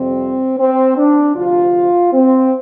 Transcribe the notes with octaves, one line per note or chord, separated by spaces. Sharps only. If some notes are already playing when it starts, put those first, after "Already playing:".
Already playing: F2 C3 G3 C4
C4
D4
D2 C3 F3 F4
C4